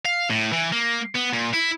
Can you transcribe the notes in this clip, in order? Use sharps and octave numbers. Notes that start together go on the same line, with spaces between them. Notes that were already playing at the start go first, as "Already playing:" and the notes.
F5
A2
E3
A#3
B3
A#2
E4